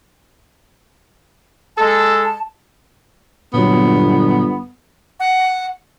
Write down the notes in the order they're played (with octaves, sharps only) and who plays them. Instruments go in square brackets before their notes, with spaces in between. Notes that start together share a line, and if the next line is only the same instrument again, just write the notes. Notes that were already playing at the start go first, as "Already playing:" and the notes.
[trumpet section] G#3 A4 [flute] A5
[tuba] G1 [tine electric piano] A#2 D3 F#3 [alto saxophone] B3
[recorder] F#5